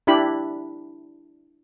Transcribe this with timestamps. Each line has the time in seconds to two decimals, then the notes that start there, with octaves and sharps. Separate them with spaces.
0.07 D4 E4 G4 B5